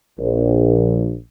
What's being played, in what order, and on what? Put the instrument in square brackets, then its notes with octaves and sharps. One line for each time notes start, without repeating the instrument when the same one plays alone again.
[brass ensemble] A#1